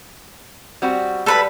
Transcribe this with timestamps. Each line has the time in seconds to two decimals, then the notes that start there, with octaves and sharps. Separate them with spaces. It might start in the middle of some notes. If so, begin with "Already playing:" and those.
0.82 G3 C4 F#4
1.26 G3 A4 B4 B5